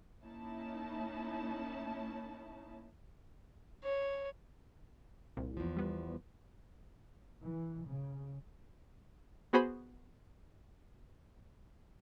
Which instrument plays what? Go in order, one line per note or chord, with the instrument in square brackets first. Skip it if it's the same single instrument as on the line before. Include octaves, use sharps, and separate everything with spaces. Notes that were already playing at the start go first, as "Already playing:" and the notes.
[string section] A#3 C#4 D#4 E4 A5
[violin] C#5
[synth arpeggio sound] C2 A#2
[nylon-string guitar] E2 F3
[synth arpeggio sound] G3 B3
[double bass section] E3
C#3
[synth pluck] B3 F#4 G#4 C5 G#5 B5